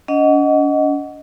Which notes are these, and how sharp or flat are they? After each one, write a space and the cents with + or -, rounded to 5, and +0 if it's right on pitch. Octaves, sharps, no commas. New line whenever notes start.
C#4 +45 D#5 +0 F#5 +0